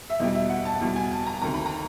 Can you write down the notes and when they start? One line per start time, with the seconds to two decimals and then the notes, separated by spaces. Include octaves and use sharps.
0.10 E5
0.19 E2 B2 G3 D#5
0.35 E5
0.50 F#5
0.65 A5
0.81 E2 B2 G3
0.96 G#5
1.11 A5
1.26 A#5
1.42 D2 C3 D#3 A#5
1.54 B5
1.66 A#5